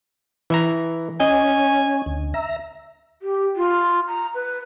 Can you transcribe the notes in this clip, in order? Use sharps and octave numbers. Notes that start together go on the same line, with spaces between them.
E3 E5 A#5
C#4 D#5 G#5
D2
E5 A#5
G4
F4
A#5
B4